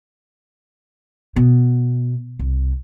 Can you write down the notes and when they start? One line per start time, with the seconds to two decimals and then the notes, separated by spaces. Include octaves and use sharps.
1.36 B2
2.39 C2